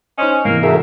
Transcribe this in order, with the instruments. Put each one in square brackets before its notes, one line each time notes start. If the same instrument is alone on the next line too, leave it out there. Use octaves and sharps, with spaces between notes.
[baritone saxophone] C#4 [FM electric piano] D#4 C5 D#5
[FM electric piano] G#2 C3 E3 [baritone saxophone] A#3
[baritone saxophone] D2 [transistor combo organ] G#4 A#4 E5